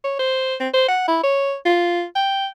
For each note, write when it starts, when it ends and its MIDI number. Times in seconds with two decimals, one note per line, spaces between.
0.04 0.18 73
0.19 0.55 72
0.60 0.68 60
0.74 0.87 72
0.88 1.05 78
1.08 1.18 64
1.24 1.55 73
1.66 2.04 65
2.15 2.46 79